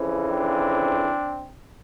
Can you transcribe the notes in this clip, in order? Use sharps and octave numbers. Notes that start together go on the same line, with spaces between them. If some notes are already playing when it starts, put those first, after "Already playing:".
Already playing: F2 C#3 E3
C4 D4